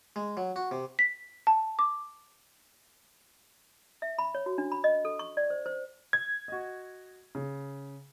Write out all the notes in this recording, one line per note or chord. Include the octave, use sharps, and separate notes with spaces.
G#3
F#3
F#4
C3
B6
A5
D6
E5
B5
C#5
F#4
D4
B5
D#5
A4
C#6
D5
C5
C5
G#6
F#4 D#5
C#3